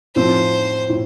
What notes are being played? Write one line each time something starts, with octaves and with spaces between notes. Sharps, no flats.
A2 F3 C4 C5
A2